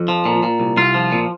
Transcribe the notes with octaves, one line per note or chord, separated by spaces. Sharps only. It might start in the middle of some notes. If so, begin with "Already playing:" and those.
Already playing: F2
F3
A#2
A#2
C2
C2 F4
F3
A#2